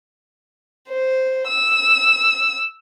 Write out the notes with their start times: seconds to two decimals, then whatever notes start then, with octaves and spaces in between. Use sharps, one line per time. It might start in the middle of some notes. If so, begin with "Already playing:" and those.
0.90 C5
1.48 E6